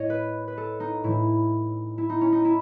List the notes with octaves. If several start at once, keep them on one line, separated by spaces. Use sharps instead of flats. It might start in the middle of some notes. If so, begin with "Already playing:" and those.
Already playing: A2 C#5 D#5
B4
B4
A4
D#4
A2 E3 E4
E4
D#4
C#4
D#4
E4